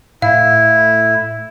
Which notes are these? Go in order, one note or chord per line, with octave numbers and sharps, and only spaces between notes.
A2 E4 F5